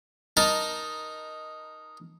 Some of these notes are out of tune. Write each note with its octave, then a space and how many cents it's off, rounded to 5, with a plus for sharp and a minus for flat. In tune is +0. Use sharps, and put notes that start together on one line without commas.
D#4 +0 A#4 +10 A5 +0